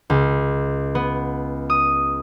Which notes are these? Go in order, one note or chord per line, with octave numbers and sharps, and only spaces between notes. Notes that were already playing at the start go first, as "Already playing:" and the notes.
C#2
B3
D#6